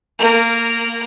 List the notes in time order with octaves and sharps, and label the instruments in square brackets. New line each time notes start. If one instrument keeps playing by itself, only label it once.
[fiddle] A#3 A#4